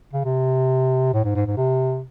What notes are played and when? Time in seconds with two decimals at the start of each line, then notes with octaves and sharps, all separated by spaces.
0.13 C#3
0.25 C3
1.13 A2
1.24 G#2
1.35 G#2
1.46 G#2
1.57 C3